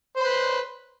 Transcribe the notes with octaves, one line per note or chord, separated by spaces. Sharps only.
B4 C5 C6